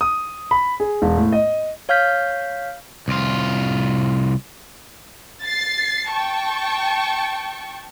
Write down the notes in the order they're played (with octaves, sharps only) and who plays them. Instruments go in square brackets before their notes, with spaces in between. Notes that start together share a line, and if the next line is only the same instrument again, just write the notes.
[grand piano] D#6
B5
G#4
E1
A2
D#5
[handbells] C#5 F5 F6 G6 B6
[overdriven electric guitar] C2 F4
[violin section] A6 C7
G5 A5 C#6